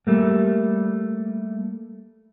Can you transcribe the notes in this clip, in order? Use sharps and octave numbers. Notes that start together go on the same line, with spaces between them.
G3 A3 A#3